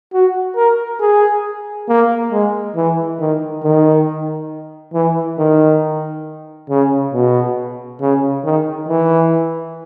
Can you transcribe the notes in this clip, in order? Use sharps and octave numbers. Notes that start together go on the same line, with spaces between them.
F#4
A#4
G#4
A#3
G#3
E3
D#3
D#3
E3
D#3
C#3
B2
C#3
D#3
E3